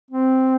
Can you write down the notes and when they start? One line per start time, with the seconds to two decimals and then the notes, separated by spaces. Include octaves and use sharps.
0.11 C4